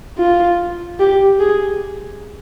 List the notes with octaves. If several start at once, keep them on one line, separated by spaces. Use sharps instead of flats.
F4
G4
G#4